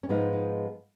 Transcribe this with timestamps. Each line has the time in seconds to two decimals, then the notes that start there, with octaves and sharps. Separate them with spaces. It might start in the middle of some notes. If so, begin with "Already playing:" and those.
0.03 C#4
0.09 G#2 F3 G#3 B3 D#4
0.33 D#4